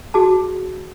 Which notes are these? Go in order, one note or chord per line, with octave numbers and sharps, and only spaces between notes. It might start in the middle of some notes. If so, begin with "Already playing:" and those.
F#4 G#4 A5